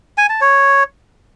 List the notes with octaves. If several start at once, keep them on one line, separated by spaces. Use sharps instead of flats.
G#5
A5
C#5